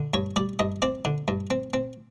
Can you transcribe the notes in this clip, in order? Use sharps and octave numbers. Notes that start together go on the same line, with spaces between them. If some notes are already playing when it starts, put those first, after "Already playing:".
Already playing: D3
G2 C#5
G3 D5
G2 D#5
C4 D5
D3
G2
C4
C4